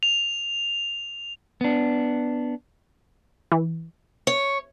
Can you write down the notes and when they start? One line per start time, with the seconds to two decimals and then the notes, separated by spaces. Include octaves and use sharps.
0.03 F7
1.61 B3 D4
3.52 E3
4.27 C#5